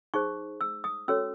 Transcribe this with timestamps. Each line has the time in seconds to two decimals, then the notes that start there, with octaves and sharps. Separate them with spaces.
0.14 D#4 G#4 C5 C#6
0.61 E6
0.84 D#6
1.08 C#4 F#4 A4 C#5 E6